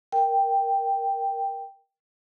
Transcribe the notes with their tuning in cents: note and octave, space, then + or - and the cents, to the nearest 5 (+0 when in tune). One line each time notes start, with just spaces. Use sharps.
A#4 +0 G5 +0